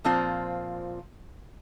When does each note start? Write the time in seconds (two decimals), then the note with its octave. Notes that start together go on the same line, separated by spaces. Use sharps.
0.04 A#2 F3 C4 F4